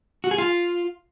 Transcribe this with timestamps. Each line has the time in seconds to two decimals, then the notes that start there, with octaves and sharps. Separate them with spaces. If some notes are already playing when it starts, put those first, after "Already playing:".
0.24 F#4
0.31 G#4
0.38 F4